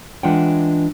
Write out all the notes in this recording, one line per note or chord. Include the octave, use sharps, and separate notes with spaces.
E3 G#3 D4 F4 F#5 G5